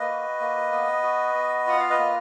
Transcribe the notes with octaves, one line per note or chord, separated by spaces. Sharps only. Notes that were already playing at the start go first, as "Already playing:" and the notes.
Already playing: A#3 B4 D#5
F#4
A#3
B3
F#4
B3
F4 F#5
F5
B4 D#5
A#3